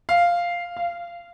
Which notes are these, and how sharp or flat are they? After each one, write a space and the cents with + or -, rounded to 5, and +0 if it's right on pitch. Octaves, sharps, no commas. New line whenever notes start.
F5 -5
F5 -20